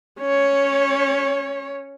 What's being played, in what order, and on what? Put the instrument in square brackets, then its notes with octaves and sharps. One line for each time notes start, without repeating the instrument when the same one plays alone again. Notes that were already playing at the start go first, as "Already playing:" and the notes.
[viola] C#4 C#5